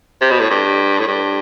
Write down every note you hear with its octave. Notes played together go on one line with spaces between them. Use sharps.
C3
B2
A2
G2
A2
G2